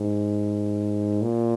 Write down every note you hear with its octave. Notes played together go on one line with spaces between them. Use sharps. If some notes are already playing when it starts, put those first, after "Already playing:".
Already playing: G#2
A#2